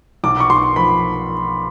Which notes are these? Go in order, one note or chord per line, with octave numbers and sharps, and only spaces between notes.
B1 D6
C#6
B1 C6
F3 B5